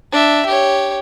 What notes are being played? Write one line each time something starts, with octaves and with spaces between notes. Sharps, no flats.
D4 E5
G4 C#5